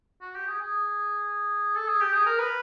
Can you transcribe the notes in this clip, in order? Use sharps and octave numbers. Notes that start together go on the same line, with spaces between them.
F#4
G4
G#4
G#4
A4
G#4
G4
G#4
A#4
B4